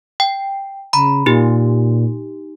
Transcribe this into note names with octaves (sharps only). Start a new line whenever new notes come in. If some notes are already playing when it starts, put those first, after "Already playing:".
G5
C#3 A#5 B5
A#2 D#4 G4